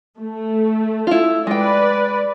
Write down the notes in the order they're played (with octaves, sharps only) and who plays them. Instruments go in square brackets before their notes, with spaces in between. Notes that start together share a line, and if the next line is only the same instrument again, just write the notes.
[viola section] A3
[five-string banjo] E4 F4
[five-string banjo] G#3 G5 [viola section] B4 D5